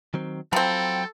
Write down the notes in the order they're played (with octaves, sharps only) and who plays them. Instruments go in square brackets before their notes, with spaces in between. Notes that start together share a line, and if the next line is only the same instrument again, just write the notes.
[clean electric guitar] D#3 F#3 C4
[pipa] F3 C4 [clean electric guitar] F#3 A#5 B5 [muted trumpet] A4 [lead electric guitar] G5